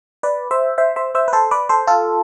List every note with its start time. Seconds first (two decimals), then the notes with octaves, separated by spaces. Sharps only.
0.23 B4 D5
0.51 C5 E5
0.78 C5 E5
0.96 C5 E5
1.15 C5 E5
1.28 B4
1.33 A4 C5
1.51 B4 D5
1.69 A4 C5
1.87 F4 A4